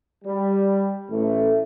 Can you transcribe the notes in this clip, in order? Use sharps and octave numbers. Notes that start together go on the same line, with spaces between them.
G3
A1 A3